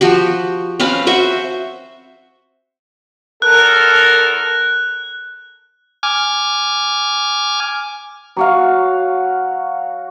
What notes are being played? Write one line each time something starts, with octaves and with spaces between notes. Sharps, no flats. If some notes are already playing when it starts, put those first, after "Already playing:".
F3 F#4 G4
C4 C#4 B4 F5
F#4 C5 E5
E2 A4 A#4 F#6
G#5 D6 F6
F#3 F#4 F5